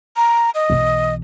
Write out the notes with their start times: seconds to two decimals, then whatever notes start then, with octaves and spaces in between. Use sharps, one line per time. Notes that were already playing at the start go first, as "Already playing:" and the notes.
0.16 A#5
0.55 D#5
0.70 B1 E3